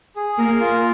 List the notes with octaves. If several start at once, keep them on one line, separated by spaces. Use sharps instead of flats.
G#4
A#3 A#4
F4